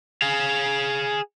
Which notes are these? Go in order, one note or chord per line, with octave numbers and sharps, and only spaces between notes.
G#4 F5